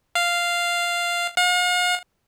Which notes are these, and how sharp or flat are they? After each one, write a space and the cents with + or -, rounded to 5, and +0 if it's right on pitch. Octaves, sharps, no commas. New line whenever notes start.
F5 -5
F5 +45